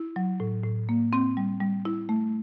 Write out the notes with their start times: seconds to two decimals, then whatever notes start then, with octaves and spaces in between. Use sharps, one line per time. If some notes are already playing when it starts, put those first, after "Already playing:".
Already playing: E4
0.16 F#3
0.40 A2
0.64 A2
0.89 A#3
1.13 C4
1.37 G3
1.61 G3
1.85 E4
2.09 A3